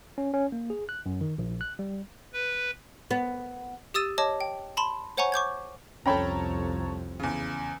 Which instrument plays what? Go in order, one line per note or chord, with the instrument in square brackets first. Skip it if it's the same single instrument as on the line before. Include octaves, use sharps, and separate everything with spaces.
[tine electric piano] C#4
C#4
A#3
G#4
F#6
F#2
D#3
A#1
F#6
G3
[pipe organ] B4
[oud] B3
[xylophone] G4 D#6 E6 A6 D#7 E7
C#5 D#5 A5 D6
G5
A5 B5 C6 E7
C5 C#5 F#5 G#5 A#5 C#6
C#6 D6 G6 G#6
[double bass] C2 F2 [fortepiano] C#4 G5 B5 [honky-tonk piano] A4 C#5 A#5
[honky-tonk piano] E2 C#3